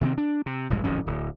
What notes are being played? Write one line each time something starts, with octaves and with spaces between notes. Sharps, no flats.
C3 D#3 A3 C4
D4
C3
E1 A#1 G2 G#3
D1 G#1 F2 C#4
D1